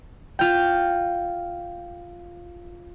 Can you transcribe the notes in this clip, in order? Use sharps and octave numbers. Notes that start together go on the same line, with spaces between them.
F4 G5